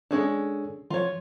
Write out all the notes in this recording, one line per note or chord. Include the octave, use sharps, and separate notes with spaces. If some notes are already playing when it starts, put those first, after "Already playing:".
G#3 C#4 D4 G#4 A4
F3 F4 C#5